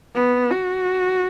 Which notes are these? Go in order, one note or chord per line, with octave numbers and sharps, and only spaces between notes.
B3
F#4